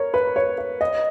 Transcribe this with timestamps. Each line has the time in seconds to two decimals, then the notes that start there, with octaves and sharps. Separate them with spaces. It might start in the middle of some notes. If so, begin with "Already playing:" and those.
Already playing: A#4 C#5
0.14 B4
0.36 C#5
0.58 C#5
0.81 D#5